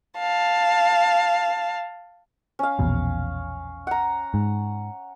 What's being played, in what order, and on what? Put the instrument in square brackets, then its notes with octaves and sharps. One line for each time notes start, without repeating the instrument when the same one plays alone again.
[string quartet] F5 A5
[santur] C#4 F5
[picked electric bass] A#1 E2 B2
[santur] F#5 A#5
[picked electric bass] G#2